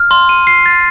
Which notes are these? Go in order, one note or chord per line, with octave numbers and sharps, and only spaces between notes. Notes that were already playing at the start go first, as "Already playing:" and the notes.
Already playing: F6
C6
D#7
C7
A6